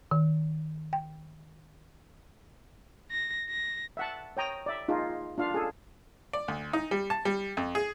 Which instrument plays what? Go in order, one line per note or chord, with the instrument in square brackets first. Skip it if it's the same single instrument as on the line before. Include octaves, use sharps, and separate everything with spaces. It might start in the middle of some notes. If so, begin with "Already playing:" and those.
[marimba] D#3
G5
[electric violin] A#6
A#6
[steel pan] E5 F#5 A5
C#5 G5 A#5 D#6
D5 E5
D#4 F4 G#4
D4 F4 F5
G#4 A4
[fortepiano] D5
D2
D#4
G3
A5
G3
F2
G#4